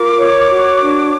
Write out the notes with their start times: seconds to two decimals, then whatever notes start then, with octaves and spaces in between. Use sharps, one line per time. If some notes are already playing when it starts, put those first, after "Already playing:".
Already playing: F4 A#4 D6
0.17 C#5
0.49 F#4
0.79 D4